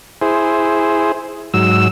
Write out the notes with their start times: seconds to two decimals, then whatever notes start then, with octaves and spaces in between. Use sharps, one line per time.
0.22 E4 G#4 C5
1.54 G#2 F#3 E6